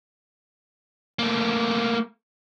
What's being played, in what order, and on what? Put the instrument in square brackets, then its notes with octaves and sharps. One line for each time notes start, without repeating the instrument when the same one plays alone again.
[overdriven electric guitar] A3 A#3